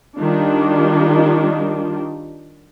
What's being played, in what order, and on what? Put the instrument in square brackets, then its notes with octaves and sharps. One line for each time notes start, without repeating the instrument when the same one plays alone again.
[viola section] D#3 G3 D4 F4